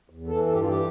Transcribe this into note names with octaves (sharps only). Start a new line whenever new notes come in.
E2
E3 A4
G2 A4
G4
F4
E3 G4